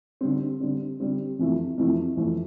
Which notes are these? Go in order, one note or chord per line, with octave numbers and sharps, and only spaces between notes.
D3 G3 C4
D3 G3 C4
D3 G3 C4
F2 C3 E3 A3 E4
F2 C3 E3 A3 E4
F2 C3 E3 A3 E4